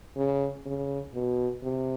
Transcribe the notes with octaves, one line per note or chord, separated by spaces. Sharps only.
C#3
C#3
B2
C3